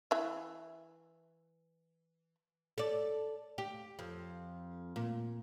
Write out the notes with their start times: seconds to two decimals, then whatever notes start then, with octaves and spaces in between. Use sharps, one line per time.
0.11 E3 E5
2.78 A4 D5
3.58 G4
3.99 F2
4.96 A#2